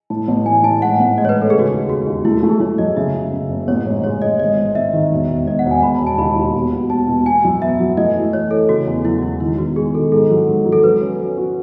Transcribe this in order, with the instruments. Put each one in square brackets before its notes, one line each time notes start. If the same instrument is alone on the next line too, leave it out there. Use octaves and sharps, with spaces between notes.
[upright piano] A2 [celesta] A5
[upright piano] A1
[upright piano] A2 [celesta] G#5
[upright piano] A2 [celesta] A5
[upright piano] G#2 [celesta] F#5
[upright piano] A1
[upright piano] G#2 [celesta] D#5
[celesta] C#5
B4
[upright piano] G#2
[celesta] A4
[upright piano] C#3 [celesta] G#4
[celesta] F#4
[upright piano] D#2 [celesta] G#4
[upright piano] E1 [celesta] F#4
[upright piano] D#2
[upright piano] A3 [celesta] E4
[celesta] F#4
[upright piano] A3
[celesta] G#4
[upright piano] A3 [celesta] C#5
[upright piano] F#2 [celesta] D#5
[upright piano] C#3 [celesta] E5
[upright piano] C#3
C#3
F#1
[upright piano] A1 [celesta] C#5
[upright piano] G#2
[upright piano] G#3 [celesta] C#5
[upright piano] G#3 [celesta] D#5
[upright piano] G#1 [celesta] D#5
[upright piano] G#1
[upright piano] G#1 [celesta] E5
[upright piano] D#3
E1
E1
[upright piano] E1 [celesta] D#5
[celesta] F#5
[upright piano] E1
[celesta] G#5
[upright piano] E1 [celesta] B5
[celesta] A5
[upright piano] E1
[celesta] A5
[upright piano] D#2 [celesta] B5
[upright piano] D#2
B2
B2
[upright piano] E1 [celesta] A5
[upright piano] B2
[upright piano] B3 [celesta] G#5
[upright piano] F#2
[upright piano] B3 [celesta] E5
[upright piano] F#3
[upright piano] A3 [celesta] D#5
[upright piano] E3
[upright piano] E3 [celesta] C#5
[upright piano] E3 [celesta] A4
[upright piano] C#3 [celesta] F#4
[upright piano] E2
[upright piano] F#3 [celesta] E4
[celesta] F#4
[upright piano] E1 [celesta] E4
[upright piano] D#3 [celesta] E4
[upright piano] E2 [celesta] F#4
[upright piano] G#3 [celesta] G#4
[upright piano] D#3 [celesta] A4
[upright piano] G#2 [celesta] A4
[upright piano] F#3
G#2
F#3
[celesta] A4
[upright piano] F#3 [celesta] B4
[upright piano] C#4
C#4
F#4